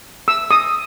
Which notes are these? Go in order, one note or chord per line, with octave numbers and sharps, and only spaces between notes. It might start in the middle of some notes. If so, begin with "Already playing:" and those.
E6
D#6